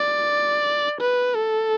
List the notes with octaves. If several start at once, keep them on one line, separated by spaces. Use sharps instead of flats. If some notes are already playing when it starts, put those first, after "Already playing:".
Already playing: D5
B4
A4